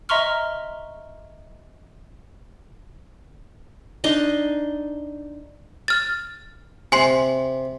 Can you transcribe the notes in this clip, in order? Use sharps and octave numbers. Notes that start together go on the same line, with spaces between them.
D#5 E5 A#5 C6 C#6 F6
D4 D#4 C6
F6 A6
C3 G#5 C6 C7